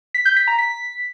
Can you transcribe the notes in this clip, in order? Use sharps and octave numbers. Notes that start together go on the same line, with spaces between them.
B6
G6
B6
A#5
B6